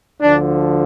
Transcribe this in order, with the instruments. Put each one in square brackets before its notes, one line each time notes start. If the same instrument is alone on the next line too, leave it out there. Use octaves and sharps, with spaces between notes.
[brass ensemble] D2 D3 F3 D4